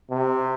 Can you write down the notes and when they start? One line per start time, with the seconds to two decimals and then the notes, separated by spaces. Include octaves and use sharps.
0.10 C3